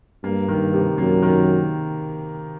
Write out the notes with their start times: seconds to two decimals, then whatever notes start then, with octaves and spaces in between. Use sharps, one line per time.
0.24 G2 A#3
0.48 D#3
0.74 C3
0.98 F#2 A#3
1.22 D#3